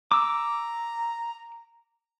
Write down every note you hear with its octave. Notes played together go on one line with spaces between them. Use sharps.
A#5 D6 E6